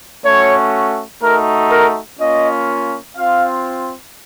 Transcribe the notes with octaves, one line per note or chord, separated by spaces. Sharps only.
A3 C#4 F#4 C#5
A3 D#4 F#4 A#4
A#4
A#3 C#4 F4 D#5
C4 F4 F5